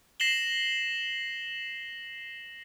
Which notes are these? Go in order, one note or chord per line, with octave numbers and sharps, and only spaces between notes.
A#6 C7 E7 F#7 G7